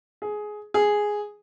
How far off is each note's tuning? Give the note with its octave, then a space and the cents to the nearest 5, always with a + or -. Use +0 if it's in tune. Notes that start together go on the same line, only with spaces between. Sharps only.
G#4 +15
G#4 +0